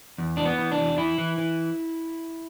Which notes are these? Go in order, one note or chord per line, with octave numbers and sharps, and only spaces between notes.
E2
E3 D4
B3
E3
D4
E2
E3 E4
E3
E3